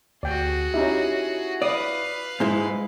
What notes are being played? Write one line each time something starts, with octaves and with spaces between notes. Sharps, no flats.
D2 F#4 G#4 D5 G5
C#4 D#4 E4 G4 E5
B4 D5 F5 D#6
G#2 G#3 E4